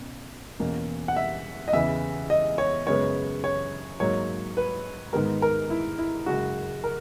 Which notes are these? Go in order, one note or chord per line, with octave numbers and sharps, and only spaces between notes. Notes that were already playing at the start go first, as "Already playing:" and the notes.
Already playing: B2 C#4
E2 B2 A#3 C#4
F#5
E5
D#5
E2 C#3 E3 E5
D#5
C#5
F#2 C#3 G#3 B3 C#5
C#5
G#2 F#3 A#3 C#5
B4
G#2 D#3 G#3 B3 A#4
A#4
E4
E4
F#2 C#3 G#3 F#4
A#4